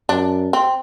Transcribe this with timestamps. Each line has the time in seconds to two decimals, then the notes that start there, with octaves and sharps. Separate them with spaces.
0.09 F#2 D4
0.53 C4